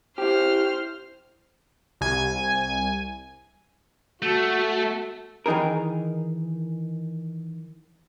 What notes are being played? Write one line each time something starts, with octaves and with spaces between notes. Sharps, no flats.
E4 G4 C5 F6
C2 G#5
A3 F#4 A4
D#3 E3 D#4 G#4 A#4